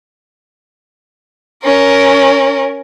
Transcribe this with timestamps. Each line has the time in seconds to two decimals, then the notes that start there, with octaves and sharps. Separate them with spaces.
1.64 C#4 A#4